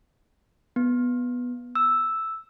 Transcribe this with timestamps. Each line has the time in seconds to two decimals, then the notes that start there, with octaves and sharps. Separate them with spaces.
0.76 B3
1.75 E6